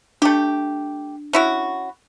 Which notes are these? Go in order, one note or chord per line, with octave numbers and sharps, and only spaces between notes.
A3 D4 G4
C#4 E4 F#4